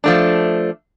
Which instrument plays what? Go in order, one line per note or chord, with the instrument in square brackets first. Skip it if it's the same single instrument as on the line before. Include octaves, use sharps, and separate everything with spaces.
[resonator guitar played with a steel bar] F3 A3 D4